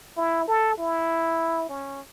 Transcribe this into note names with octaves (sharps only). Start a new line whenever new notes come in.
E4
A4
E4
C#4